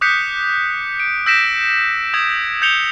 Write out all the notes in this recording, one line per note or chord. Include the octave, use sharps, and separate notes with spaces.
D6 D#6 F#6 G6 B6 C#7
D7
E6 G6 A#6 B6 D7 E7
D#6 E6 G#6
G6 G#6 C#7 F7 G7